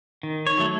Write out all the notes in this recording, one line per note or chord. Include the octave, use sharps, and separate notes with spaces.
D#3
C#5
F#3 A3